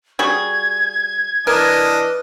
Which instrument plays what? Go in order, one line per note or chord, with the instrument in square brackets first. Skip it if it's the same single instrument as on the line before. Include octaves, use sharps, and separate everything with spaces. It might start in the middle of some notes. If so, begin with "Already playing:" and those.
[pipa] G3 F#4 G#4 [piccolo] G#6
[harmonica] E3 D4 D#5 [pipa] A#4 [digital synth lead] B4